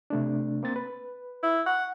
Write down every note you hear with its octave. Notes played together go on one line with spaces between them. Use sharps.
C3 A3 D4
A#3 C4 A6
B4
E4
F#5